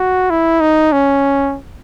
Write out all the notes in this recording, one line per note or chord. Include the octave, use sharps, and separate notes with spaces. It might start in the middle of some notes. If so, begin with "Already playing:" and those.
Already playing: F#4
E4
D#4
C#4